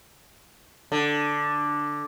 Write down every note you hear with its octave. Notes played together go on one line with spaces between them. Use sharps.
D3